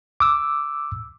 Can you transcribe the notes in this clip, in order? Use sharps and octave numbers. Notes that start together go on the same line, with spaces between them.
D6 E6